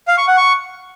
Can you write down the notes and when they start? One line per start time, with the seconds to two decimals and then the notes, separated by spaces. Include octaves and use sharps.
0.08 F5
0.18 C#6
0.27 F#5
0.37 C#6